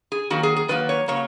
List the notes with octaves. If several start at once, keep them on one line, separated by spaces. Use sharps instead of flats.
G#4
D#3 F#3 A#3 F#4
G#4
G#4
D#3 F#3 A#3 B4
C#5
C#3 F#3 A#3 C#5